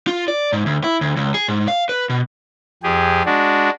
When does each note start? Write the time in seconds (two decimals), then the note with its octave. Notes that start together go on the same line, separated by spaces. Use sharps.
0.07 F4
0.28 D5
0.53 G#2
0.66 D2
0.84 E4
1.01 D2
1.16 C#2
1.34 G#4
1.48 G#2
1.68 F5
1.89 B4
2.09 B2
2.83 F2 G4 G#4
3.25 G#3 D4 F#4